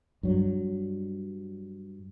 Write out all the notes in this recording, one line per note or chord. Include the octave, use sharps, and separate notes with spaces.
G2 F#3